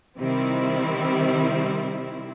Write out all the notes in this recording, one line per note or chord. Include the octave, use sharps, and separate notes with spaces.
C3 D#3 G3 C4 E4